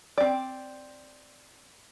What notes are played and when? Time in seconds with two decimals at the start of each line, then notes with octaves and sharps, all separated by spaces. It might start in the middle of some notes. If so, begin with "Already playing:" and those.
0.18 C4 D5